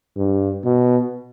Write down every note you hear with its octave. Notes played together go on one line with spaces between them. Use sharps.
G2
B2